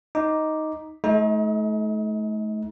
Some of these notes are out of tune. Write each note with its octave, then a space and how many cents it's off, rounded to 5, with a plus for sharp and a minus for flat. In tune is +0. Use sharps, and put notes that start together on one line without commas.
D#4 +5 D6 +0
A3 -35 D#4 +35 A4 -30